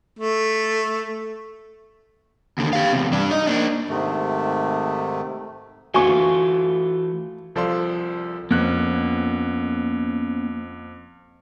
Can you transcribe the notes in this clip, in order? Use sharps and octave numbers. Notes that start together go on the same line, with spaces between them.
A3
D#2 D3
G4 F5
E2 C3
G2 D4
D#4 D#5
A#3 D4
G#2 C3 D#3 A3
E3 A3 F4 F#4 G#5 C#6
C2 F3 A4 D5 F5 C6
F2 A#3 B3 C#4 F#6